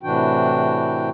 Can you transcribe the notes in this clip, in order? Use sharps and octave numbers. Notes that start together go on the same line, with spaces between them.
A2 C3 E3 D4 F#4 G5